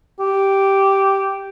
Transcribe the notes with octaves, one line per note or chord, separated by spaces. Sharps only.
G4